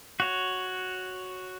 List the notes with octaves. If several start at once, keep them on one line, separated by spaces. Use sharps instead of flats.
F#4 C#5